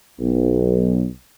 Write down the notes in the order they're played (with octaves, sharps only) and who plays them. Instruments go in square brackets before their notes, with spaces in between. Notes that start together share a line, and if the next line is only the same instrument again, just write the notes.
[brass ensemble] B1